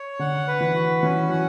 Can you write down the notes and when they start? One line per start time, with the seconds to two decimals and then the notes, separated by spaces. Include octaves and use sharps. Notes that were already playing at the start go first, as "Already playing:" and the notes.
Already playing: C#5
0.19 D3 F#5
0.48 B4
0.60 E3
0.75 F#4
1.02 E3 C#4
1.29 F#3 F#5